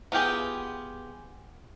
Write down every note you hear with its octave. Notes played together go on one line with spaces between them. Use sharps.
B3 F4 G4 G#4